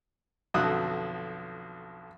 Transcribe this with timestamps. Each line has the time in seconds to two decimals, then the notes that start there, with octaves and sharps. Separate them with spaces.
0.54 B1 F2 D3 F#4 D#6 F#6